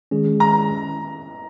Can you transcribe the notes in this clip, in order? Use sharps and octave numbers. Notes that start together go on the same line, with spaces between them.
D#3 G#3 C#4 G#4
A#5